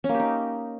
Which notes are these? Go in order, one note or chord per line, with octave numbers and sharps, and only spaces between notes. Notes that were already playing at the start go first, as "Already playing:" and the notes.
C#4
A#3
G4
D#4